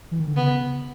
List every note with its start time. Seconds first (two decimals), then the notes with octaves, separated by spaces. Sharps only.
0.11 E3
0.19 D#3
0.27 D3
0.36 C#3 B3